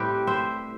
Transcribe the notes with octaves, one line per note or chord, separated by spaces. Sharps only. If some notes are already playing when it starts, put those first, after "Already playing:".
Already playing: A2 G3 C4 G4 B4
C5 E5